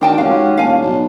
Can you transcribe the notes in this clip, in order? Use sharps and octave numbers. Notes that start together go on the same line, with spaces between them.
D#3 D4 F#4 G5 A5
F1 C#4 F#4 G4 F5
G#2
D#1 A2 D4 F5 G#5
B1